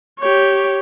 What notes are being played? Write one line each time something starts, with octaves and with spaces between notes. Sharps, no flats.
G4 C#5